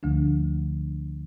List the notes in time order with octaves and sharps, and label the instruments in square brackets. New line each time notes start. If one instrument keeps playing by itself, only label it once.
[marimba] D2 D3 F3 A3 D4